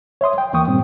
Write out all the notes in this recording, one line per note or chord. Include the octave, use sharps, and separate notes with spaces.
C#5 E5 C6 D#6
G5
D#2 E3 A#3 G5 C#6 D#6
G2 A#2 G3 C4